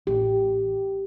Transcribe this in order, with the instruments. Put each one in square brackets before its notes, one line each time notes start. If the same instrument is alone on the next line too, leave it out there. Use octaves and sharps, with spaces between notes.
[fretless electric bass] A1 [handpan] G4